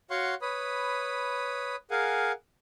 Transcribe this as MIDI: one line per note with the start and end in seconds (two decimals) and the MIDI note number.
0.10 0.35 66
0.10 0.35 73
0.10 0.35 77
0.10 0.35 78
0.10 0.35 84
0.10 0.35 85
0.42 1.76 71
0.42 1.76 73
0.42 1.76 83
0.42 1.76 87
1.91 2.32 68
1.91 2.32 70
1.91 2.32 77
1.91 2.32 78
1.91 2.32 80